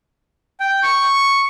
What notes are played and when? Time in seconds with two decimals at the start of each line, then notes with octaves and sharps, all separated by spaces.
0.60 G5
0.83 C#6